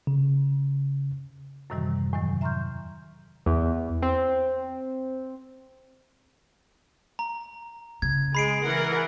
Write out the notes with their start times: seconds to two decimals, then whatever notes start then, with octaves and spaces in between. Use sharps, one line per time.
0.07 C#3
1.70 F#2 A2 C3 D#3 E3 G3
2.13 E2 A2 C3 D#3 E3 F#3
2.41 E5 A#5 C6 C#6 F6 G6
3.46 E2
4.02 C4
7.19 A#5
8.02 C#3 G#6
8.35 G#3 B5 C7 D7
8.64 E3 A#4 F#5